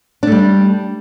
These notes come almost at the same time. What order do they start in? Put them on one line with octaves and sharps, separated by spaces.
D4 A3 G3